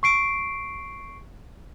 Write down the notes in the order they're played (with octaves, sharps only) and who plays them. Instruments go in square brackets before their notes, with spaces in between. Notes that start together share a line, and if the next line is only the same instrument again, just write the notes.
[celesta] C#6 C7 D7